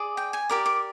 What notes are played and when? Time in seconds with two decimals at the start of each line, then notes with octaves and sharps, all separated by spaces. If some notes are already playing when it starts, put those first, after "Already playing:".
Already playing: G#4 D5
0.17 G5
0.33 G#5
0.49 G4 A#4 D5
0.66 D6